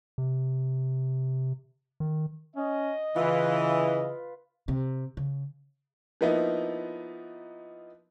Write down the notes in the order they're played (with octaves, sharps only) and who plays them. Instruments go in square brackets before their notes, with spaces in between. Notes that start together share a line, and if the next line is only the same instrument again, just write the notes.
[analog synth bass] C3
D#3
[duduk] C#4 [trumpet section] D#5
[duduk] C#3 [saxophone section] E3 [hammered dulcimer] F4 B4
[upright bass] C3
C#3
[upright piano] F3 A#3 B3 D#4 E4